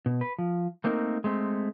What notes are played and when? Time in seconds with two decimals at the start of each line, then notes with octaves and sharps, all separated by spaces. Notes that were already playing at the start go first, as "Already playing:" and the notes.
0.06 B2
0.21 B4
0.38 F3
0.84 A3 A#3 C4 D#4 A#4
1.24 G#3 A3 C4